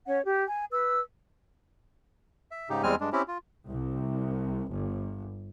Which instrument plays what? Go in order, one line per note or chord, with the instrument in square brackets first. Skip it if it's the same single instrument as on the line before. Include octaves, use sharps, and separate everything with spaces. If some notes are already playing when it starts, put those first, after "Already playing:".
[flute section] C#4 C#5 F#5
G4
G#5
B4 E6
[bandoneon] E5
G#2 C#3 D#4 G4
E2 G3 G#3 C4 G#5 F6
G2 G#3 D4
C4 C#4 E4 G4
F4
[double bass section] C2
G1